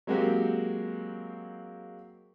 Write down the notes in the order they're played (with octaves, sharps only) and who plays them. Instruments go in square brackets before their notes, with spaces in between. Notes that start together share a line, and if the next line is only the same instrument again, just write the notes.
[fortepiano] F#3 G#3 A#3 C4 F#4 G4